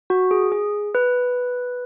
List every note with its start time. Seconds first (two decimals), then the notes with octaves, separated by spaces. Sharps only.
0.10 F#4
0.31 G#4
0.52 G#4
0.95 B4